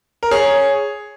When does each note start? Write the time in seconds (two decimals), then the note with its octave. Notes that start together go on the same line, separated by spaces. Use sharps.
0.23 A#4
0.31 G#4 C#5